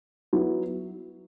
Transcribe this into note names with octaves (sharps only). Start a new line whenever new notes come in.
F#3 B3 E4